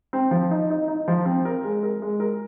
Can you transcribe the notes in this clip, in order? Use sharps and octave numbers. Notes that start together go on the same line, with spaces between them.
C4
F3
D#4
D#4
D#4
F3
C4
A#4
G#3
A#4
G#3
A#4